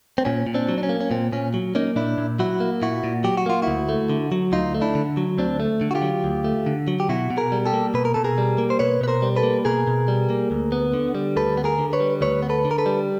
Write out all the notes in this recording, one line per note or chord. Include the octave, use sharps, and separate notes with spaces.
C4
A#2 C#4
A#2
C4 D4
F#3
D4
C#4
A#3
C#4
A#2 C4
A#2 C#4
F#3
A#3 C#4 D#4
A#2 D4 E4
A#2
F#3 E4 F#4
A#3
A#2 E4 F#4
A#2
F#3 G4
F#4
A#3 F4
D2 E4 F#4
A3
D3
F#3
D2 D#4 F4
A3
D4 E4
D3
F#3
D2 C4 D4
A3
D3
F#4
F4 G4
F#3
D2
A3
D3
F#3
G4
B2 E4 F#4
B2
G#4 A#4
G3
G4 A4
A#3
B2 B4
A#4
B2 A4
G#4 A#4
G3
A#3
C5
B2 B4 C#5
B2 B4
A#4 C5
G3
A4 B4
A#3
B2 G#4 A#4
B2
G3
A#3
D2
B3
D3
G3
D2 A4 B4
B3
G#4 A#4
D3
B4 C#5
G3
D2 B4 C#5
B3
A4 B4
D3
A#4
A4 B4
G3